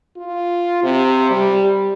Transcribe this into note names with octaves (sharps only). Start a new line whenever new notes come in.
F4
C3
G3